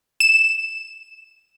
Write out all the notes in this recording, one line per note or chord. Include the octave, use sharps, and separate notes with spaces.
E7